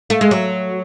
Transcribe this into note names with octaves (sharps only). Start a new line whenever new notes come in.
A3
G#3
F#3